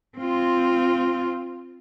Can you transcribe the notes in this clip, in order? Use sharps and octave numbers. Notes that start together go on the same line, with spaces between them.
C4 F4